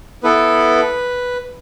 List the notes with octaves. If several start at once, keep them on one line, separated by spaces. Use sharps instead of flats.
B3 E4 A4 B4